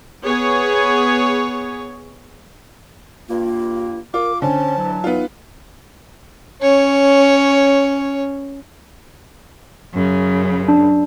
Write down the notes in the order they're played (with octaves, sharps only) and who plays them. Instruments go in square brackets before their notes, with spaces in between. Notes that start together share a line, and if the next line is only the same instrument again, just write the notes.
[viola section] B3 G#4 C#5
[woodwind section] G2 A#3 [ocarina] F4
[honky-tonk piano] F4 [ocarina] A#4 [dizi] D6
[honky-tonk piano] D3 [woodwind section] C#4 [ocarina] C5 [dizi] A5
[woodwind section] E3 F#3
[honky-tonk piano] B3 F4 [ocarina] D#4
[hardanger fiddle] C#4 C#5
[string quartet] F#2 C#3
[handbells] D4